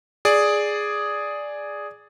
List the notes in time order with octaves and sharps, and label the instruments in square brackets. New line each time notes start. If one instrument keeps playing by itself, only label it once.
[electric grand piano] G#4 D5